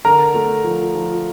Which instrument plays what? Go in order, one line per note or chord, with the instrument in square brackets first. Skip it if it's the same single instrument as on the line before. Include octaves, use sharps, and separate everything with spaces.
[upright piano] D3 [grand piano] A#4 A#5
[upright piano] A3
F3
F3